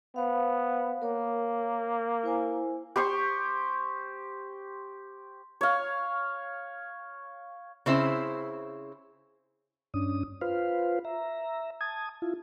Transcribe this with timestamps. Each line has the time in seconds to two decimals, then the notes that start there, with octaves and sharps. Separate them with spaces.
0.16 B3 C5 F5
1.02 A#3 A#4 C#5
2.23 E4 C5 G#5
2.96 G4 C5 C6 C#6
5.61 C#5 F5
7.86 C#3 C4 E4 C5
9.94 G2 C#4 D4 D#6
10.41 F4 B4 C5 F5
11.05 E5 A#5
11.81 A5 D#6 G#6
12.22 E4 F4